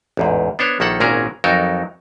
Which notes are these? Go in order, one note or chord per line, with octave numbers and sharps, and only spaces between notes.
A1 E2 G#2
B3 D4 C5 C#5
A#1 D#3 A#3 A4 F#5
G#1 A#2 C#4 F#4 G#4 A#4
F2 F#3 D#4 A4 A#4